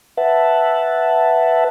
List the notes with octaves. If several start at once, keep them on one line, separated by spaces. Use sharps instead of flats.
B4 E5 F#5 A5